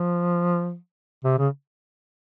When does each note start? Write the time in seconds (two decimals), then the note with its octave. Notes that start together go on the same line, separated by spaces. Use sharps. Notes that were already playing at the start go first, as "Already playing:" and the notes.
Already playing: F3
1.25 C3
1.39 C#3